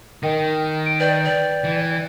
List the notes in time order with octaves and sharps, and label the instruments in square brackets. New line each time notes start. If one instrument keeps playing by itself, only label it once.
[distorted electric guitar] D#3 [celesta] A#4 D#5 G5
[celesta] D7
[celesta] B4 G5 G6 [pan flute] D5
[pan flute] D5
[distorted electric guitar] E3